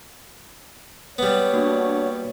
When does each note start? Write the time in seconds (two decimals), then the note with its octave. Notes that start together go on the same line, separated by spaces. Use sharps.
1.18 G3 B3 C#5
1.54 A#3 D4 F#4